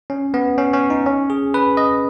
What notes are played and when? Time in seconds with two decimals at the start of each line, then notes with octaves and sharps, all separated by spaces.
0.10 C#4
0.34 B3
0.58 C#4
0.73 C#4
0.90 D#4
1.06 C#4
1.30 G#4
1.54 B4
1.77 D#5